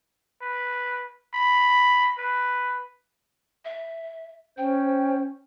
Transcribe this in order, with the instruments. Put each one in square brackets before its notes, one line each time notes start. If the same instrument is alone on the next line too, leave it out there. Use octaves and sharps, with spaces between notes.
[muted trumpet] B4
B5
B4
[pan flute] E5
[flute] C#4 [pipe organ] C5 [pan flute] G5